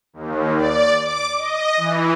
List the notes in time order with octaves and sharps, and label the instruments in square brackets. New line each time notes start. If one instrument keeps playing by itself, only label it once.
[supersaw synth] D#2
D5
D6
D#5
E3